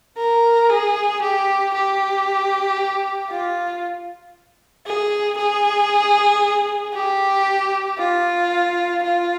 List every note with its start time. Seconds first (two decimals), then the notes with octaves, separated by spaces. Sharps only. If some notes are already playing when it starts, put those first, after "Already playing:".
0.18 A#4
0.70 G#4
1.22 G4
1.74 G4
3.30 F4
4.86 G#4
5.38 G#4
6.95 G4
7.99 F4
9.03 F4